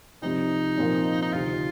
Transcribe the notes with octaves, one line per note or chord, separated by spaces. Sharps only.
C2 C3 F3 C4 D#4
A#2 F3 C4 F4 A#4
D#4
D2 C3 D#3 F4